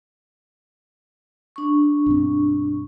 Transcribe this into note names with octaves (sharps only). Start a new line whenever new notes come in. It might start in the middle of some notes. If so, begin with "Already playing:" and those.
D4 C#6
B1 G2 C4